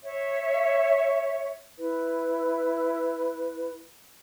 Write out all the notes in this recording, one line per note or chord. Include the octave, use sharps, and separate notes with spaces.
C#5 E5
E4 B4